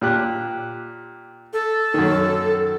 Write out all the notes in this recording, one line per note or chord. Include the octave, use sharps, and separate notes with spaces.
A#2 G4 F#6
A4
F#2 D#3